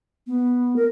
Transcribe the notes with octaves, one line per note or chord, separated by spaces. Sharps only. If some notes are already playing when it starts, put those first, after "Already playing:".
B3
A#4